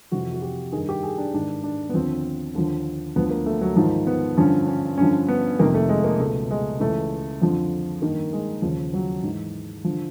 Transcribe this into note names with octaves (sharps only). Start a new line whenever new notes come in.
F2 C3 E3 F#4
F#4
G4
G2 D#3 G#4
G4
G#4
D4
G#2 D#3 D4
D4
B3
D#2 D3 F3 C4
D#2 D3 F3
D2 D3 F3 B3
A#3
A3
F#3
G#2 D#3 F3
B3
G2 D3 F3 C#4
C#4
G2 D3 F3 C#4
B3
F2 C3 D#3 A#3
A3
G#3
A#3
C#2 B2 A3
G#3
C#2 C#3 E3 A3
F2 D3 F3
G2 D#3 A#3
G#3
D#2 C#3 F3
F#3
G#2 E3
D3 F3